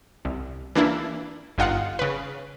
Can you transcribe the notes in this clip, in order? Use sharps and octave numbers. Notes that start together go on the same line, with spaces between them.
C2
E3 A#3 D4 E4
G1 D#4 F4 F#5
C#3 B4